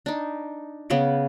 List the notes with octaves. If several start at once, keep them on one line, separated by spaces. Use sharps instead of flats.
D4 D#4
C#3 B3 G#4 D6